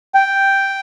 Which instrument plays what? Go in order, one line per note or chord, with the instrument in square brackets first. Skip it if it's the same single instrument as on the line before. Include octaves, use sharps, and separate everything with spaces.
[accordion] G5